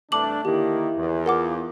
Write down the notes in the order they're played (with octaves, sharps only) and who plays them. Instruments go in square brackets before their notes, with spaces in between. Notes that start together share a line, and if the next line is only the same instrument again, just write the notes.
[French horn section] G2 C3 E3 [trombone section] A3 D4 [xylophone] A5 D6 F#7
[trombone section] D3 D#3 A#3 [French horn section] E4 [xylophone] G4
[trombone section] E2
[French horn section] F4 [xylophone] A#4 F#5 D6